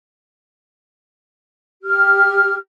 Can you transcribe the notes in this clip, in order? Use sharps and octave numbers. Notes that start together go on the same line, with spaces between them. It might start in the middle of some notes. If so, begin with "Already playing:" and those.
G4 F6